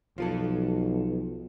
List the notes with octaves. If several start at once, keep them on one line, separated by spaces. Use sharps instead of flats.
B1 F3 F4 A4